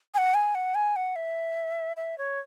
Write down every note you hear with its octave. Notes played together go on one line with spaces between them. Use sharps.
G#5
F#5
G#5
F#5
G#5
F#5
E5
E5
C#5